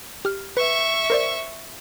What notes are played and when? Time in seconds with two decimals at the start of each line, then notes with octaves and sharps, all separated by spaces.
0.25 G4 F6
0.57 B4 E5 C#6
1.10 A#4 C5 D5